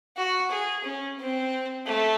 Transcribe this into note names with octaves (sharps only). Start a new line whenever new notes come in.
F#4
G#4
C#4
C4
A3